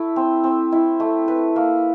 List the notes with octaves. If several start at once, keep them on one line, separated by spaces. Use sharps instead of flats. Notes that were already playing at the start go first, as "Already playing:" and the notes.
Already playing: A3 E4
C4
C4
E4
A3
B4
A#3